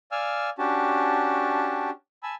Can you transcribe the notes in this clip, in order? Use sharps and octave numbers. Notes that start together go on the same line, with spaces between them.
D5 F5 G#5 E6 F6
C#4 D4 F#4 G4 A5
G#5 A5 B5 E6